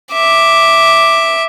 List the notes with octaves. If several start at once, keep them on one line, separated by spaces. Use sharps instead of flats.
E5 D6